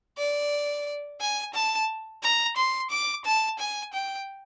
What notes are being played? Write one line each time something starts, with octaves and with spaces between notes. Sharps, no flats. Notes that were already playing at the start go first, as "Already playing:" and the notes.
D5
G#5
A5
A#5
C6
D6
A5
G#5
G5